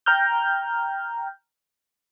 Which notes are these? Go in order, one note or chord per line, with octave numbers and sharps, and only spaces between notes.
G5 A#5 F6 G6